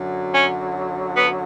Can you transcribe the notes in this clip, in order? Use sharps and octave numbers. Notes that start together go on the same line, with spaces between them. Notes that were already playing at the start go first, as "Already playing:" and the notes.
Already playing: F#2 D3 F#3
C#4
B3